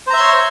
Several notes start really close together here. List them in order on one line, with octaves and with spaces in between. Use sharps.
C5 A#5 E5 C6 C#5